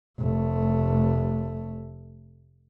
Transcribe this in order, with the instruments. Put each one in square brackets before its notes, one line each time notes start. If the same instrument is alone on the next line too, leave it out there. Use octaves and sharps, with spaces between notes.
[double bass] F1 A3